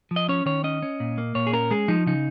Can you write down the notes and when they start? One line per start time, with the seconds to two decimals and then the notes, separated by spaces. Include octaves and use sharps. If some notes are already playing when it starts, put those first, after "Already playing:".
0.11 F3
0.16 D#5
0.29 C#4 C#5
0.46 D#3 C#5
0.64 C#4 D#5
0.82 C#4
1.00 A#2
1.18 A#3
1.35 A#2 C#5
1.47 G#4
1.53 C#4 A#4
1.71 G#3 G#4
1.88 F3 D#4
2.07 C#3 D#4